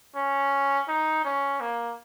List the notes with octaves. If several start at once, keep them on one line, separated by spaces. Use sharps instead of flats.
C#4
D#4
C#4
A#3